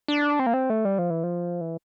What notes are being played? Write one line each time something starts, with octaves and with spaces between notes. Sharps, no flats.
D4
C4
A#3
C4
A3
G3
F3
E3
F3
E3